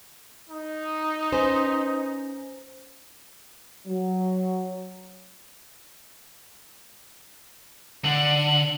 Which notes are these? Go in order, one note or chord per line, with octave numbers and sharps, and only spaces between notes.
D#4
C#4 B4 C5 G#5 A#6
F#3
D3 F#7